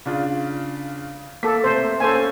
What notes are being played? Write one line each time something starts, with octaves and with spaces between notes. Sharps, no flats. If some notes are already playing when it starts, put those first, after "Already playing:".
C#3 D4 F4
A#3 A4 D6 B6
C3 A3 C5
A#3 C#4 A4 C5 G#5